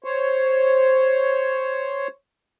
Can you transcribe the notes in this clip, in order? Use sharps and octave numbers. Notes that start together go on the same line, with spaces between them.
C5 C#5